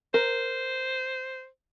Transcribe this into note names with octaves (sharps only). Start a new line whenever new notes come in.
A#4 C5